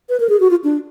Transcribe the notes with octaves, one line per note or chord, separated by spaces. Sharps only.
B4
A#4
G#4
F#4
F4
D4